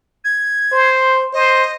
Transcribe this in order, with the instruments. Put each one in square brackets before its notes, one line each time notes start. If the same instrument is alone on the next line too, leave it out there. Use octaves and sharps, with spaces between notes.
[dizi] G#6
[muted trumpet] C5
[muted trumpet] C5 [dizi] D#5